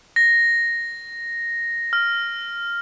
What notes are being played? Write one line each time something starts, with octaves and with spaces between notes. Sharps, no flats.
A#6
F6